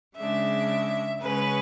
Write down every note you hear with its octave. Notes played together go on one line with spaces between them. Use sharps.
C#3 G#3 D4 E5
C#3 G#3 C#4 B4